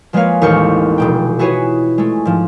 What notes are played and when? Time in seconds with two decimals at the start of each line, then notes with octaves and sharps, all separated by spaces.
0.13 F3 G#3 A#3 B4 C#5 F5
0.41 A1 D#2 C5 C#6 F6 C#7
0.98 F1 B2 G5
1.39 E4 F#4 G#4 B4 C#5
1.98 G#3 A3
2.25 G#2 F3